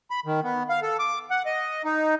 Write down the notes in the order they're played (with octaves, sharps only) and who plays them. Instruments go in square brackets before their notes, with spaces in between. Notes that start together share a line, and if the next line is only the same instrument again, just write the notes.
[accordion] B5
D#3
B3
F5
A4
D6
F#5
D#5
D#4